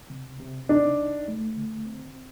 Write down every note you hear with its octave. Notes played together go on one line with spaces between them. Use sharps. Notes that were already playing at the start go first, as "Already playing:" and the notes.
Already playing: C2
C3
C3
D4 D#4
C2
A3
D3
C4